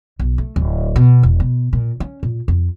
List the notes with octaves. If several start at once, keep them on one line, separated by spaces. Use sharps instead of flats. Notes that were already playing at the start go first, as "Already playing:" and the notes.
B1
A3
D1
B2
E1
B2
A#2
C#4
A#2
F2